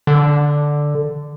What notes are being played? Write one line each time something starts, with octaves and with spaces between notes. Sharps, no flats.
D3